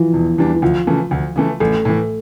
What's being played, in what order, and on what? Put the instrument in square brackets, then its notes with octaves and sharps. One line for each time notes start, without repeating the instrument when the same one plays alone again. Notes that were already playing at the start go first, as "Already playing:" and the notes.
Already playing: [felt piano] E3 F3
[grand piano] E1
E2 E3 G3 D4
[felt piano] E3
[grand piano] D2 [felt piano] F3
[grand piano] C#3 E3 A3
D2
C#3 E3 A3
[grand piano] A1 [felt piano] A3
[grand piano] A2 E3